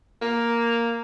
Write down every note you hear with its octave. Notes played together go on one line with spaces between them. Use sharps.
A#3